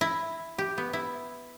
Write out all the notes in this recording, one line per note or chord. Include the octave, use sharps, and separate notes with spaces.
E4
G4
B3
E4